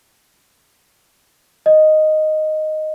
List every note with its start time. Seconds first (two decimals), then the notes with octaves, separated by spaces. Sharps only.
1.66 D#5